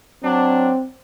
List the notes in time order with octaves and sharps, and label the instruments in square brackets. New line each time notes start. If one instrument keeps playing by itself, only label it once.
[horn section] F#3 D4 [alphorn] C4